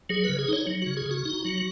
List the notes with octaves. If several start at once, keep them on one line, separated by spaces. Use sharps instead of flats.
F#3 G#4
C#3 B4
G#4
D#4 C#5
F#3
C#3 F#4
G#4
C#3 F#4
D#4
F#3